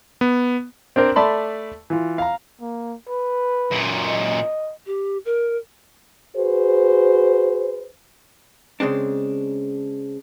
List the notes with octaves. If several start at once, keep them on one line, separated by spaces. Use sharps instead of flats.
B3
C4 D4 A#4 C5
A3 D5 A5 B5 C6
E3 F4
F5 A#5
A#3
B4
F#2 A#2
D#5
G4
A#4
F#4 G#4 B4 C5
C#3 G#3 C4 D4